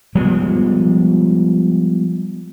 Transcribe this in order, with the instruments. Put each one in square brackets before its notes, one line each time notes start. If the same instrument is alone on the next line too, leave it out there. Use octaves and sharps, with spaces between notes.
[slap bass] F3 G3 G#3 B3